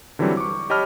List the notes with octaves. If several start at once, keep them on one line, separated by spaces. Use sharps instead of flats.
D3 E3 F#3 G3 C4
C#6 D6
G4 C#5 D#5 A5 B5 F6